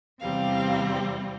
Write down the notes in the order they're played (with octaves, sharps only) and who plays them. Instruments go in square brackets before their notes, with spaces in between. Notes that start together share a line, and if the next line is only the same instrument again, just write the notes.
[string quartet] E2 C3 G3 C4 F5